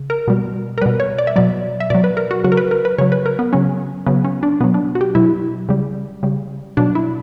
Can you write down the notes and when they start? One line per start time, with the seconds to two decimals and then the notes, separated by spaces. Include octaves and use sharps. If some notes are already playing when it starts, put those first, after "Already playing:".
Already playing: C#3
0.10 A#4
0.28 B2 G3
0.78 A#4
0.81 B2 G3 B4
1.00 C#5
1.18 D5
1.27 E5
1.36 B2 F#3 D5
1.80 E5
1.90 B2 F#3 D5
2.04 B4
2.17 A#4
2.31 F#4
2.44 C#3 F#3 F#4
2.52 A#4
2.57 B4
2.71 A#4
2.85 B4
2.98 C#3 F#3 C#5
3.12 B4
3.26 A#4
3.39 B3
3.53 C#3 F#3 C#4
4.06 C#3 F#3 B3
4.25 C#4
4.43 D4
4.60 B2 F#3 B3
4.74 D4
4.95 F#4
5.01 G4
5.15 B2 F#3 E4
5.69 C#3 G3
6.23 C#3 G3
6.77 B2 F#3 D4
6.95 E4